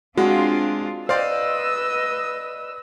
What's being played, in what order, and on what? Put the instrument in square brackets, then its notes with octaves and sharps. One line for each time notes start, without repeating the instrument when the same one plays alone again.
[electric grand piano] G#3 [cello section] C4 D4 F4 [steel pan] F#4
[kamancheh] B4 E6 [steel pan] C5 [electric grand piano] D5 F5 [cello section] D#5